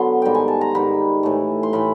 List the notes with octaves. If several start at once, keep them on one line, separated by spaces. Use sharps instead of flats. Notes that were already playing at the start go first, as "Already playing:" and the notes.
Already playing: D3 F#3 B3 C6
G#2 D#3 G3 G5
G#5
A5
A#5
G#2 D#3 G3 B5
A2 E3 A3
C6
A2 E3 A3 B5